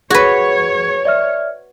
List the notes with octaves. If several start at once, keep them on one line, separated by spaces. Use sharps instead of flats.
F#4 G#4 B4 C#5 G#6
D5 E5 F6